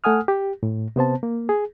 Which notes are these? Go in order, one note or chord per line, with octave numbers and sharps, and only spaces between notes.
A3 A4 F#5 G#5 D#6 F6
G4
A2
C3 B3 C5 A5
A#3
G#4